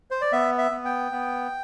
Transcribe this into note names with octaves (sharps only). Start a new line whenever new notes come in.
C5
D5
B3 E5
E5
B3
G5
B3